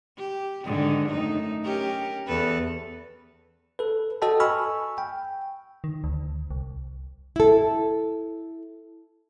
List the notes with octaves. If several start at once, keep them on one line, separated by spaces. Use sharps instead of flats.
G4
G#2 D3 D#3
F#2 A3 D#4
C#4 G4 A#4
E2 A4 B4
A4 B4
F#4 A4 D#5 G5 A5
G#5 B5 C#6 E6 F6
G5
D#3
D2
C2
E4 A4